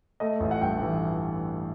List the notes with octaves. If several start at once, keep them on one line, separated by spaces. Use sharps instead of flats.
A3 D#5
A1
F#5
G2 G5
E3